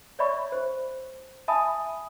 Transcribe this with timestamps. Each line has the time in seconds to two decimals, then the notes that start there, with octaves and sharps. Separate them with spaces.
0.19 C#5 D5 E5 B5 C#6
0.52 C5
1.48 E5 G#5 A5 B5 D#6